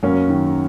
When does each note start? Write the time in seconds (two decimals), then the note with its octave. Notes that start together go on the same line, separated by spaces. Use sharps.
0.03 F#2 A#3 C#4
0.29 D#3